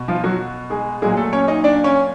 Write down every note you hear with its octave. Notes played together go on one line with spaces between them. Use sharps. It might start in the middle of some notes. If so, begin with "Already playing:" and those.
Already playing: B2
F3 F4
F#3 F#4
G#3 G#4
A#2 F#3 G#3 G#4
A3 A4
C#4 C#5
D#4 D#5
D4 D5
C#4 C#5